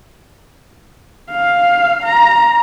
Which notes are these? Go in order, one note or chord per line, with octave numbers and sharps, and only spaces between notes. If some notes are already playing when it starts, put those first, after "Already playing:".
F5
A#5